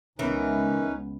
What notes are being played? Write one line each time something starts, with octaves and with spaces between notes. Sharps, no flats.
C#2 C#3 E3 B3 C#4 D#4 A#4 B4